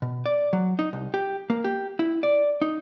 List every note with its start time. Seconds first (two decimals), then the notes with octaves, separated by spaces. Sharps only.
0.02 B2
0.26 D5
0.53 F#3
0.79 D#4
0.93 C2
1.14 G4
1.50 A#3
1.64 G4
1.99 E4
2.23 D5
2.62 D#4